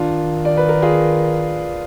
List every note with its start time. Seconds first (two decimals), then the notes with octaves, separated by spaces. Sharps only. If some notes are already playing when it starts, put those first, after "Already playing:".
Already playing: D#3 D4 F4
0.45 D5
0.57 B4
0.69 A#4
0.82 F4 G#4